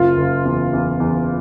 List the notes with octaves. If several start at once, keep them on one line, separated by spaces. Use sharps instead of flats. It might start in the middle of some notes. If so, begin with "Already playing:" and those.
Already playing: F#1 F4
F#1
E2
E2
E2